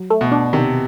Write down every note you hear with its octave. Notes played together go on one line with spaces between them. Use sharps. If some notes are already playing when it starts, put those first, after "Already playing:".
Already playing: F#3
A3
B2
D4
C3 D#3